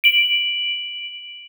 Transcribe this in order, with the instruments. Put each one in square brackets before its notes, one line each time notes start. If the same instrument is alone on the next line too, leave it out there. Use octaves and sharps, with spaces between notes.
[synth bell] D7 F#7